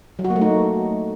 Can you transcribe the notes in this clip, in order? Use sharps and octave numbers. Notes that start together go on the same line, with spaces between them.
F#3
F#4
A#3
A3
D#4